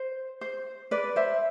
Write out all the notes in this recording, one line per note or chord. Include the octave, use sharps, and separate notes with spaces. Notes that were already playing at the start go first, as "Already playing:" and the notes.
Already playing: C5
C5
B4 D5
C5 E5